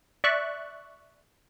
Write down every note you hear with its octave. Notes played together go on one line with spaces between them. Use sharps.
D5 E5 C#6 F#6